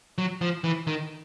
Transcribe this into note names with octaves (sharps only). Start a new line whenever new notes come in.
F#3
F3
E3
D#3